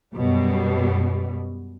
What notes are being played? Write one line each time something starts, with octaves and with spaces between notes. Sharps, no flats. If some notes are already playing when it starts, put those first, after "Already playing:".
F#2 B2 G3